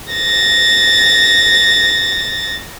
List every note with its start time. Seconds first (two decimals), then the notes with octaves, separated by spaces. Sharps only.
0.12 A6 A#6